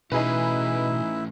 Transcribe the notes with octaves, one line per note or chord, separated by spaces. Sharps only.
B2 E3 A3 C#4 D#4 E4 G#4 B4